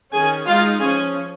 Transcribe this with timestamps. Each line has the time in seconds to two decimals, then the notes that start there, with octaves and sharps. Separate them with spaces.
0.12 D#3 C#4 G#4 G#5
0.47 G#3 D#4 F4 F5
0.80 F3 C#4 G#4 G#5